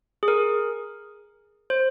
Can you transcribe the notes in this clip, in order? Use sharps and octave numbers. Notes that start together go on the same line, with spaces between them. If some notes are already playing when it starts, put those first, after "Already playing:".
G#4
A#4
C5